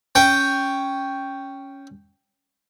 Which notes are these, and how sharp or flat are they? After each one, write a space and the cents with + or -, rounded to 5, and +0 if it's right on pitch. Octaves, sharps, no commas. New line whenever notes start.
C#4 +0 G5 +0